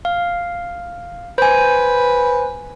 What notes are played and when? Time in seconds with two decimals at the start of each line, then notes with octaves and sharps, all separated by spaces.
0.05 F5
1.38 B4 C5 G#5